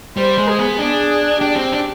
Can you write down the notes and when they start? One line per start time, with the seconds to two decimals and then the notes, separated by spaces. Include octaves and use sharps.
0.17 G3 C5
0.38 G#3
0.48 G#4
0.58 B3
0.79 D4 G#4
1.41 D4 G4
1.56 C4
1.72 D4